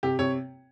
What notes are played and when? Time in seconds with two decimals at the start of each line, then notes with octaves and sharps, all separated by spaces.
0.03 C3 G4
0.19 C3 C#5